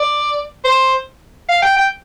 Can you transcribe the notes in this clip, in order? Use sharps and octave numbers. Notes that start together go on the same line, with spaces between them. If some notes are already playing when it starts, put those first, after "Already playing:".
Already playing: D5
C5
F5
G5
G5